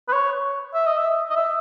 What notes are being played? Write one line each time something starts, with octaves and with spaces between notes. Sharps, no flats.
B4
C#5
E5
D#5
E5
D#5
E5